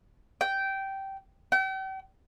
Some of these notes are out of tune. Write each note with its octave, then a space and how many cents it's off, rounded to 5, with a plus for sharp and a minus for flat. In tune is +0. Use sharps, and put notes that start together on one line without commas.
G5 -15
G5 -40